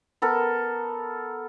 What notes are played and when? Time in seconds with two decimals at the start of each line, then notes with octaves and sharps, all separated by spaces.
0.22 B3 A4 A#4